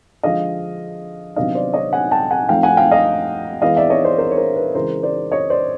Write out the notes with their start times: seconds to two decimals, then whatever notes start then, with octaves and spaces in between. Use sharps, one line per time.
0.23 D3 F3 G#3 D#5 F5
1.36 C3 D#3 F#3 B3 D4 D#5 F5
1.55 C5 D5
1.74 C#5 D#5
1.93 F#5 G#5
2.12 G5 A5
2.31 F#5 G#5
2.49 F3 A3 C4 D#4 F5 G5
2.63 F#5 G#5
2.77 F5 G5
2.91 D#5 F5
3.62 E3 G#3 B3 D#5 F5
3.77 D5 E5
3.90 C#5 D#5
4.04 C5 D5
4.18 A#4 C5
4.31 C#5
4.37 A#4 C5
4.56 B4
4.75 C#3 E3 G#3 A#4 C5
5.03 C5 D5
5.32 C#5 D#5
5.50 C5 D5